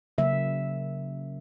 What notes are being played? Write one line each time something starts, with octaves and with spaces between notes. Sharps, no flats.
C#3 F#3 A#3 E5